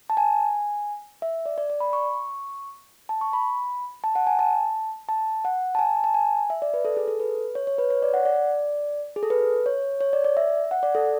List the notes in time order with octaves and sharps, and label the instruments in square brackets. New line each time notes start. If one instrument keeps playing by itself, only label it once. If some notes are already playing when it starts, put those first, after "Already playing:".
[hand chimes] A5
G#5
E5
D5
D5
D5
B5
C#6
A5
C#6
B5
A5
F#5
G#5
A5
A5
F#5
A5
G#5
A5
G#5
E5
D5
B4
A4
G#4
A4
B4
C#5
C#5
B4
C#5
D5
F#5
D5
G#4
A4
B4
C#5
C#5
D5
D5
E5
F#5
D5
A4